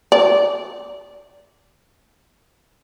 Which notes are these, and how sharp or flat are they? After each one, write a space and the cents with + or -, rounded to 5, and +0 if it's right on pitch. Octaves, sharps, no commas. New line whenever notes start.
D5 -20